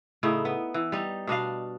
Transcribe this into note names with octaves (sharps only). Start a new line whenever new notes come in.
A2 C#3 D#4 E4
B3
E3
G3 D#4
B2 D4 D#5 F5